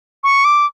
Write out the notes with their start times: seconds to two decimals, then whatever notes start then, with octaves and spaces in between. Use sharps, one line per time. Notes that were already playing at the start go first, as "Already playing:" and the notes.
0.24 C#6
0.45 D6